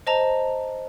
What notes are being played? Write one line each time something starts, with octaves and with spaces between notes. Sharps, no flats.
C5 D#5 A5 A#5